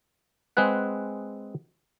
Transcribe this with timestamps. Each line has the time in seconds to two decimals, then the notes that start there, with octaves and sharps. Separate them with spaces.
0.57 G#3 C4 G#4 B4 F#5